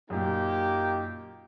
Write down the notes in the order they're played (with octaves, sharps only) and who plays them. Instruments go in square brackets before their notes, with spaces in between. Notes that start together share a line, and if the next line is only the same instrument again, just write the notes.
[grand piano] F#2 A#2 [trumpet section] A#3 D#4 G4